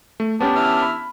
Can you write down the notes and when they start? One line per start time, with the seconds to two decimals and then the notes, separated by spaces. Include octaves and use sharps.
0.20 A3
0.41 B3 C#4 D4 G4
0.55 E3 E5 F6
0.82 B5